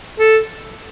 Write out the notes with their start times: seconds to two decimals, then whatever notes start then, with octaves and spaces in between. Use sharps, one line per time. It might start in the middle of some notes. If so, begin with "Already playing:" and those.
0.19 A4